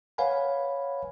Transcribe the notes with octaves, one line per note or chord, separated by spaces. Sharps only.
B4 C#5 F5 F#5 G#5 B5